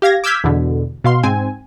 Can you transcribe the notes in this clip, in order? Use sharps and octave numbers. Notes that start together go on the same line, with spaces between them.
G4 F5 G#6 A#6
D6 E6 F6 G6 G#6 B6
E2 B2 D3
B2 F5 C6
G#2 C4 G#5